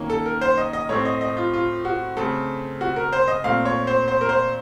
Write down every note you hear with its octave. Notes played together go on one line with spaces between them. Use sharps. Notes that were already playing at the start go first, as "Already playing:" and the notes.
Already playing: D#3 A#3 C#4
A4
A#4
C5
D#5
D#5
A2 A3 C4 C#5
D#5
D#5
F4
F4
F#4
C#3 A3 C4 A4
F#4
A#4
C5
D#5
A#2 A3 C4 F5
C#5
C5
C5
A#4
C5